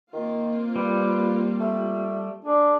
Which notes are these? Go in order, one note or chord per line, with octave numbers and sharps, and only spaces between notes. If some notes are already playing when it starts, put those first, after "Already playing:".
D#3 A#3 C4 F4
G3 B4
A3
D4 G#4